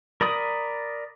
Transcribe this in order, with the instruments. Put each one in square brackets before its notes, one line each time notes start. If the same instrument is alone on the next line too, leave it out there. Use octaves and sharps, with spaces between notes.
[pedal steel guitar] A#4 D5 B5 D#6